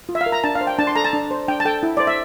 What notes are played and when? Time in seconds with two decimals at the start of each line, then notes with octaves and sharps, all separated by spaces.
0.09 F4
0.15 E5
0.21 F5
0.26 A#4
0.32 A#5
0.44 D4 A5
0.55 F5
0.61 C5
0.67 G5
0.78 D4 A5
0.87 C6
0.96 A4 A#5
1.05 A5
1.13 D4
1.31 C5
1.48 D4 G5
1.60 A5
1.65 A4 G5
1.83 E4
1.97 C5 D5
2.07 E5